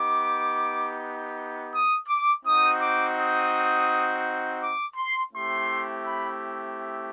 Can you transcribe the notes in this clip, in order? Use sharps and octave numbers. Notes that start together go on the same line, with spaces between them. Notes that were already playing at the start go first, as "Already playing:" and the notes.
Already playing: B3 D#4 G4 D6
D#6
D6
C4 D#4 F#4 D#6
D6
D#6
D6
C6
A3 C4 E4 G4 C6
B5